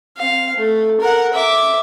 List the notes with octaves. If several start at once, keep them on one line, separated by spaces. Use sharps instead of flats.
C4 F5
A3
A#4 F#5
E5 D6